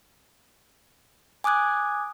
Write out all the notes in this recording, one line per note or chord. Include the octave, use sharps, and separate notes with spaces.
G#5 D6 D#6 F#6 G#6